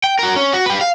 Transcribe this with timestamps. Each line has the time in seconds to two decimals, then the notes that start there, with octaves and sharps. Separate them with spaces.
0.04 G5
0.19 F#4 A#4
0.36 C#4
0.53 F#4
0.66 G4 B4
0.81 F5